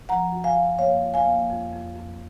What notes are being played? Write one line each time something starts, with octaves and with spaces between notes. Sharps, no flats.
F3 F#5 A#5
F#2
F5 G#5
F#2
A#3 C#5 F5
F2
F5 G#5
A#3
F2
F2
F2